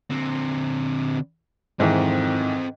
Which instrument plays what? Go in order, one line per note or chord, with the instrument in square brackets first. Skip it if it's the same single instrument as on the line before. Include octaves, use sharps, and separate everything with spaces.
[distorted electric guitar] D3 C4
[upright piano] G#2 D#3 E3 [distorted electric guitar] C4 A4